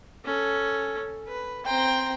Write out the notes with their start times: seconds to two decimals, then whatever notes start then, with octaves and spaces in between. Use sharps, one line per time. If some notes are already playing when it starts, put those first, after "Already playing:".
0.25 C#4 A4
1.28 B4
1.66 C4 G5 A#5 C6